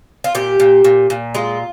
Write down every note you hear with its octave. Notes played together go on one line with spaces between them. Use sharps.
F4
A#2 G4
A#2
A#2
A#2
G#3 F4